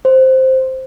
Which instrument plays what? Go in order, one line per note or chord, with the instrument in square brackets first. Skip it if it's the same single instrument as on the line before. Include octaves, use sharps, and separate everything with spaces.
[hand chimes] C5